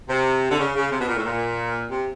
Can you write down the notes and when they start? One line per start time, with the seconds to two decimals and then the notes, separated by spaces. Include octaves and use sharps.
0.09 C3
0.51 D3
0.59 C#3
0.75 C#3
0.92 C3
1.00 B2
1.08 A#2
1.16 A2
1.24 A#2
1.91 C3